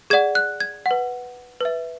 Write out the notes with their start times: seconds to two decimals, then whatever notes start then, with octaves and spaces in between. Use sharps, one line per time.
0.10 G#4 D5 F#5 G#6
0.35 F#6
0.60 G#6
0.86 F#5
0.91 B4
1.61 B4 E5